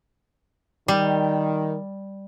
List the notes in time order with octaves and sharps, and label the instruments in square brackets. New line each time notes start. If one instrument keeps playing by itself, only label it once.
[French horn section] D#3 [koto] G3